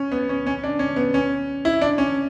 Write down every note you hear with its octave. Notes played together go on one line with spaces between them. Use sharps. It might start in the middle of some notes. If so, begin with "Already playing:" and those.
Already playing: C#4
B3
C#4
C#4
D4
C#4
B3
C#4
E4
D4
C#4